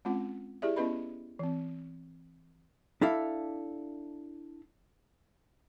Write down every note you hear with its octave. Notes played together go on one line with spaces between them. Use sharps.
G#3 C4 C#4 F4 F#5
E4 G4 G#4 D5 E5
B3 C#4 E4 B4 D#5 B5
E3 C4
D4 E4 A4 F5